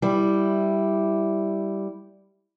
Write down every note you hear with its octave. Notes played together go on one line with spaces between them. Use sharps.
G3 E4